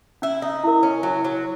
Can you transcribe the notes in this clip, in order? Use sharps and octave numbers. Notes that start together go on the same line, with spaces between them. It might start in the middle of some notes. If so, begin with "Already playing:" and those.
C#4 E4
D#4
E4 A#4
C#4
F#3 E4
F#3